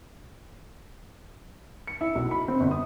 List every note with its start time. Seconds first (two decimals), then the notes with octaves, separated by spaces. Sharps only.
1.87 C#7
2.01 E4
2.15 B1
2.31 B5
2.48 C4
2.60 G1
2.71 D#6